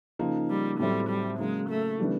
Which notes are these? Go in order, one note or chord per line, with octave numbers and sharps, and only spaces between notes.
C#3 F3 A#3 D#4
G3
A2 F#3 G3 A3 C4
G3
C#3 F#3 G#3 A#3
A3
C#3 E3 G3 B3 D4